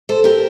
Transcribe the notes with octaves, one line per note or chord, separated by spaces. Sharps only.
A4 C5
G4 A#4